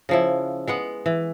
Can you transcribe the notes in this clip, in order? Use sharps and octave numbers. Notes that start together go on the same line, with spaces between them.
C#3 F3 E4
G#3 B3 F#5
E3